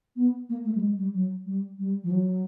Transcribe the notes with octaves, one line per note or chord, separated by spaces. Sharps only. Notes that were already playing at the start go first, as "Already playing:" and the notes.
B3
A#3
A3
G3
G#3
G3
F#3
G3
G3
F3
F#3